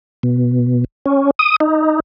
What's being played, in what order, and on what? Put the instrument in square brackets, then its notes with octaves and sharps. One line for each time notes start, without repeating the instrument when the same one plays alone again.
[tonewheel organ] B2
C#4
D#6
D#4